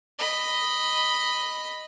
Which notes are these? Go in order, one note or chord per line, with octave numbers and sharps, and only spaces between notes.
D#5 B5